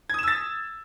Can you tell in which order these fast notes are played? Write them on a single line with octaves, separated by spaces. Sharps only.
G#6 D#6 E7 E6 A6